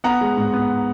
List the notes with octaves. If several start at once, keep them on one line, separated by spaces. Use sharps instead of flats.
B3 F#5 A#5
G#3
G#2
B3